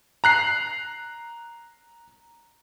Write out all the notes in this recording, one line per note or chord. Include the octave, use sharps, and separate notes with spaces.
A#5 F#6 C7